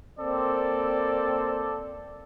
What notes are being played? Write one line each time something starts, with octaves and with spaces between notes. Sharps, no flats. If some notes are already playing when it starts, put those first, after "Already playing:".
A#3 C4 A4 D5